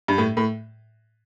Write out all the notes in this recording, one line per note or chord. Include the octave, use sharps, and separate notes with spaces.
G2
A2
A2